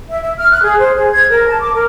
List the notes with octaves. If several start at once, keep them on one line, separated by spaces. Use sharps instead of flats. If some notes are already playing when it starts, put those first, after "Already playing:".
E5
E5
F6
F#6
G#4
C5
G#4
G#6
A#4
A5
D6
A#4